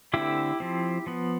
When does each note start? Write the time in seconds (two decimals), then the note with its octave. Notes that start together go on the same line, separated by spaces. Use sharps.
0.13 D3 A3 C4 E4 G4
0.60 F3 C4
1.07 F3 B3